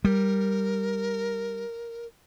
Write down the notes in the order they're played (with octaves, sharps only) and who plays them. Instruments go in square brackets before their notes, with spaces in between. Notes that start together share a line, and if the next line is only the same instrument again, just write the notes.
[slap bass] G3 [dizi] A#4